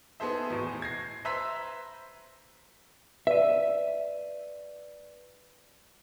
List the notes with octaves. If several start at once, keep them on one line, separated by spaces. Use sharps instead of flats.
B3 D#4 G#4 A4 C5 E5
E2 A2
G#6 A#6 C7
B4 C5 E5 A#5 E6 B6
B4 D5 E5 D#7